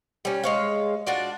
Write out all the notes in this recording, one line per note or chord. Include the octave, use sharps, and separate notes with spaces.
G3 C#4
G#3 C#5 F5
D4 F4 F#4 D5